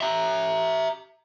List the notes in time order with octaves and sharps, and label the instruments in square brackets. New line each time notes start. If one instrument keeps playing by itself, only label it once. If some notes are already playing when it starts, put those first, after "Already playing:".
[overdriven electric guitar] E5 A#5